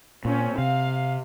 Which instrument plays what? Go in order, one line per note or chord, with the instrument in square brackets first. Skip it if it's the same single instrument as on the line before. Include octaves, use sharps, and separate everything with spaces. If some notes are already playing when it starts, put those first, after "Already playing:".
[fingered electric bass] A#2 [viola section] C4 C#4
[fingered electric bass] C3 [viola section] F5